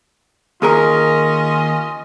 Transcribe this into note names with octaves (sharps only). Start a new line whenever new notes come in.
D#2 C#4 F4 G#4 A#4 D#5